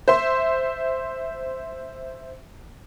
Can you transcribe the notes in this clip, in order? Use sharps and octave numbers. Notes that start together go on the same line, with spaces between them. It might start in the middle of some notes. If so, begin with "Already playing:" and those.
C5 E5 C6